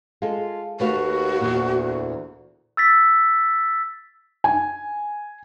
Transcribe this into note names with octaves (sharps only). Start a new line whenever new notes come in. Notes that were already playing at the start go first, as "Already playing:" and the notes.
G#3 F4 A4
D#2 A3 F#4 B4 F5
E2 G2 A#2
D2
E6 A6 B6
G#5